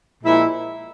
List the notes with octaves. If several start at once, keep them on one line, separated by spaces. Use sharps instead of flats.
A#2 F3 G#3 E4